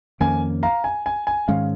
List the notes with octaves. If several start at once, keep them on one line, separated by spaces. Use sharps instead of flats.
F2 D#3 A#3 C#4 G#5
F5 A#5
G#5
G#5
G#5
G#2 D#3 G#3 C#4 F5